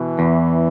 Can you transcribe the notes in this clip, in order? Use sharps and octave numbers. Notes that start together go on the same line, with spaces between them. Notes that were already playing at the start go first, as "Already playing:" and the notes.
Already playing: B2 E3
E2